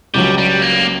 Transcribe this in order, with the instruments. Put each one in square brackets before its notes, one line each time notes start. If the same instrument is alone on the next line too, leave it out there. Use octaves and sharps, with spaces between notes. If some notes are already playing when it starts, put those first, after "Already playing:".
[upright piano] C#2 C#3 F#3 [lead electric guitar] G3
[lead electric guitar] G3
A#3